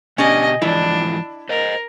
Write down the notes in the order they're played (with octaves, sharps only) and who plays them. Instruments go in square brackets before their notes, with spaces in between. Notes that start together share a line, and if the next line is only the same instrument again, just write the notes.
[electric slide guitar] B2 B3 G4 [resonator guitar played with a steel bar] C#4 D4 D5 [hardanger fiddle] D#5 G#5
[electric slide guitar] G#2 E3 F3 [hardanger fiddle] D4 [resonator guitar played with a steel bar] E4
[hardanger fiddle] A#4 [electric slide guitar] C5 D#5